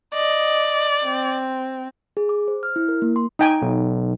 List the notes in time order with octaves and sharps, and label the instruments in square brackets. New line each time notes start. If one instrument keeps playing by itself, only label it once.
[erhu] D5 [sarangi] D#5
[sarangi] C4
[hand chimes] G#4
D6
C5
F6
E4
A#4
A#3
C6
[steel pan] D#4 G5 G#5
[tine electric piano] B1